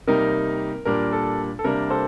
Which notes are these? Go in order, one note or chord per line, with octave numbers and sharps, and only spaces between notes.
C3 G3 A#3 D#4 A#4
A#2 G3 A#3 D4 A#4
A4
A4
C3 G3 A#3 D4 A#4
A4 C5